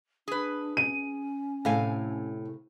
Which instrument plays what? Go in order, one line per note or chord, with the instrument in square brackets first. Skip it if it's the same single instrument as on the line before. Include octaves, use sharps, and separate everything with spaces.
[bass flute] D4 [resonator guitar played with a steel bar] G#4 B4
[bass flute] C#4 [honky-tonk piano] D#7
[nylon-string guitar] A2 A3 [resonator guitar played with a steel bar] C3 F5 G#5